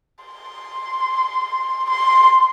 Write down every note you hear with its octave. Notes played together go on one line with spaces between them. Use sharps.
C6
C6